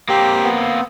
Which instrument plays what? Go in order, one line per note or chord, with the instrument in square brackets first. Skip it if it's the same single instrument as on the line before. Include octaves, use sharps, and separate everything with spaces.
[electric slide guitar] A#3 C4 [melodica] G4
[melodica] B3